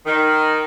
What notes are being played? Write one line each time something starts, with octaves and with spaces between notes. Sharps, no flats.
D#3